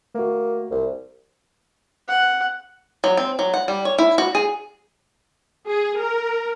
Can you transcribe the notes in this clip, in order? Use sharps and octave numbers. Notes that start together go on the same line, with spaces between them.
A3 A#3 F#4
C2
F#5
F#3
C4
F#3
F#5
G3
C#5
E4
F#4
G#4
G#4
A#4